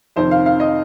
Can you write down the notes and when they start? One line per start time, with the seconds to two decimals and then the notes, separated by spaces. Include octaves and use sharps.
0.16 F2 C3 D#3 C5
0.31 F5
0.46 F5
0.60 D#5